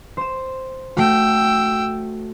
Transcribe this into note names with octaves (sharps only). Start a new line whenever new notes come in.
C5 E7
A3 F#4 G5 E6